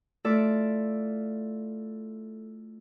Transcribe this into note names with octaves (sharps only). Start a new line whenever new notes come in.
A3 E4 F4 A4 D5 E5